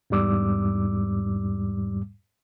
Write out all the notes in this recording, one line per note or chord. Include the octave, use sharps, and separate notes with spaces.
E2 G#2 G3 D6 E6